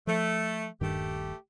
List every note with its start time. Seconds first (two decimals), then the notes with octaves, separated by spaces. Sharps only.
0.07 F3 A3
0.81 D#1 G2 D#3 A3 G4